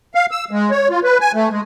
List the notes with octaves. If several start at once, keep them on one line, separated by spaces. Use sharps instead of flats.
F5
E6
G#3
C#5
F4
B4
G#5
A3
G#3